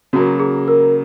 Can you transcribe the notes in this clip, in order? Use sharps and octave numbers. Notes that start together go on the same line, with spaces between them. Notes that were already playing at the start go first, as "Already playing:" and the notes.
C#3 F#3 A#3 F#4
G#4
A#4